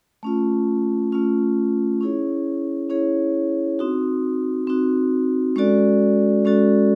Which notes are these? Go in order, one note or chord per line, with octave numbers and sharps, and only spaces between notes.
A3 C#4 F4
A3 C#4 F4
C#4 E4 G#4 C#5
C#4 E4 G#4 C#5
C4 D#4 F#4
C4 D#4 F#4
G#3 C#4 F#4 A4 D5
G#3 C#4 F#4 A4 D5